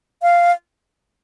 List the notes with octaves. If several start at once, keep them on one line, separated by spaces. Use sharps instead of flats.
F5